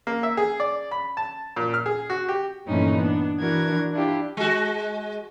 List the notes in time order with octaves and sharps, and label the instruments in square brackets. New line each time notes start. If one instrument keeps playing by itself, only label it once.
[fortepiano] A#3
E5
G#4
D5
B5
A5
A#2
F6
G#4
F#4
G4
[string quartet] G2 A#2 E3 A3 C#4 D#4
B3 D4
E3 D4 F#4 A#4 G#6
D4 E4 F4 G4
[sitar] G#3 F#4